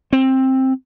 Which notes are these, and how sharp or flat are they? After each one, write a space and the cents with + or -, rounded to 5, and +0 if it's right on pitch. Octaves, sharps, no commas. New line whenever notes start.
C4 +10